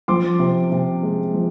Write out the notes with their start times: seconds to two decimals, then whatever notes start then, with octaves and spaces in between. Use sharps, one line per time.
0.08 F3 C6 D6
0.39 C3
0.72 C3
1.03 G#3
1.34 F3